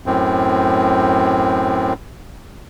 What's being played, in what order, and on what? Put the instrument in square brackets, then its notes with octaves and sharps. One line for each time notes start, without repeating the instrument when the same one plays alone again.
[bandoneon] F#2 A2 C4